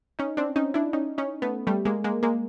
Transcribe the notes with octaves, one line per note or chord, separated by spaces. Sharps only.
C#4 D#4
C4 D4
C#4 D#4
D4 E4
C#4 D#4
C#4 D#4
A3 B3
G3 A3
G#3 A#3
G#3 A#3
G#3 A#3